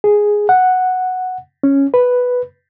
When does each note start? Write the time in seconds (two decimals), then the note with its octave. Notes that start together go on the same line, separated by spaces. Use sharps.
0.04 G#4
0.49 F#5
1.63 C#4
1.94 B4